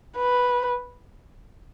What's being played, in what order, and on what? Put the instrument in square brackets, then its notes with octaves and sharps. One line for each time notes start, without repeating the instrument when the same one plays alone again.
[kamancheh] B4